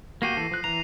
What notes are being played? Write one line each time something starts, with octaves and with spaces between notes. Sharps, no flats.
A#3 F#4 G4 A#6 C7 D#7
E3 A4
F3 F#6
E3 A#5 F7